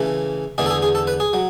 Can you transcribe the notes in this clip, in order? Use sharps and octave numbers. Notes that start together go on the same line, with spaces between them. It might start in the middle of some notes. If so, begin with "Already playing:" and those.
Already playing: C#3 E3 A3
E2 D3 A3 G#4
A4
G#4
G#4
A4
B4
G#4
F#3